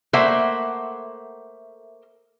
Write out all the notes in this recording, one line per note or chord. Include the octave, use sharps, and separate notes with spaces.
A3 A#3 C5 E5 F#5